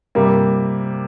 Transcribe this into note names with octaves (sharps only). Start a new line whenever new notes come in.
C3 G3 A#3